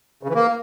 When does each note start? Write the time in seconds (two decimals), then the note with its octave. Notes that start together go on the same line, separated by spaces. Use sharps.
0.23 C#3
0.29 E3
0.35 A#3